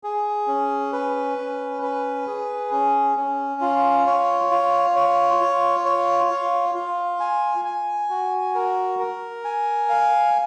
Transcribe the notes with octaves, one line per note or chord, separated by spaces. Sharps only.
G#4
C#4
B4
C#4
B4
G#4
C#4
C#4
F4
C#5
F4
C#5
F4
C#5
F4
F4
G#5
G#5
F#4
A#4
A#4
G#5
F5